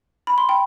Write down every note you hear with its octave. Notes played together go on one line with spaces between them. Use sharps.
B5
C6
G5 B5